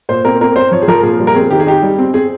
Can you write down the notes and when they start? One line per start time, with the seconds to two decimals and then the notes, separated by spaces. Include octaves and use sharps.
0.09 A#2 C5
0.25 C4 A#4
0.41 C4 A#4
0.56 C4 C5
0.72 F3 C#5
0.82 G#4
0.88 F3 A#4
1.03 A#2 G#4
1.20 G3
1.27 A#4
1.34 C4 G#4
1.50 D#3 G4
1.60 G#4
1.66 D#4 G4
1.83 G3
1.99 C4
2.14 C4 G#4